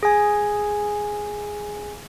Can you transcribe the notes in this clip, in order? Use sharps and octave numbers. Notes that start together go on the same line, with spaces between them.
G#4 G#5